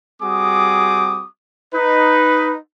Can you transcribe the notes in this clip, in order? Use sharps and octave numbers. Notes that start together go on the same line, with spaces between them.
G3 C4 F#4 G#4 D6 D#6
D#4 B4